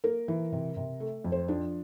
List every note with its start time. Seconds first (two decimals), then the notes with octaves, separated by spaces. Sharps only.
0.04 A#3 A#4
0.28 E3
0.52 C3
0.77 C3
1.00 A3
1.24 F2
1.32 C5
1.48 F3 D4